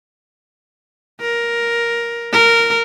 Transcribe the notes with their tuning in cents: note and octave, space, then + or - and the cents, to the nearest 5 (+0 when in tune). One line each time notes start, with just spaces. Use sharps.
A#4 +10
A#4 -10